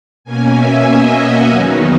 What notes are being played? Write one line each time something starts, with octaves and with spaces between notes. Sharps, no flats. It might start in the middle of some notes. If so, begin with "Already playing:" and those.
B2 A#3 C#4 G#5
E5
D#5
F#4
E2 D#3 F#3 B3 D#4